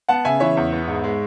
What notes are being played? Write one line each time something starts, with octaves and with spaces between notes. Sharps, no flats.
B3 F#5 A5
C#3 E5 G#5
E3 C#5 E5
E2
B3
G#2
G#3